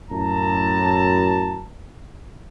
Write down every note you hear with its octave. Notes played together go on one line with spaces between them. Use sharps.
F#2 A2 A5 A#5